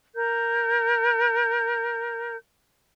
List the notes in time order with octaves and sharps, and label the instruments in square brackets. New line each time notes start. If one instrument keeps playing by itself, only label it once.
[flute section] A#4 G6